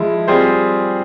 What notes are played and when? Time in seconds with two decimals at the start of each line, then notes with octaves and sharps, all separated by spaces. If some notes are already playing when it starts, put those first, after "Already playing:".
Already playing: F3 G#3 E4
0.28 G3 C4 F4 G#4 C5